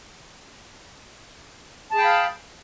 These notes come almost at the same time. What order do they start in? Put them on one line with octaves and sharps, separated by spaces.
A5 G#4 G5 B5 F5